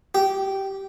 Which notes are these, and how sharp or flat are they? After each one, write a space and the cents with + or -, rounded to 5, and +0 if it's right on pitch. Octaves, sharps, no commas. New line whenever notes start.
G4 -15